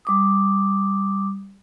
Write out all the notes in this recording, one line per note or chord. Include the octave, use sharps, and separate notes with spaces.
G3 D6 D#6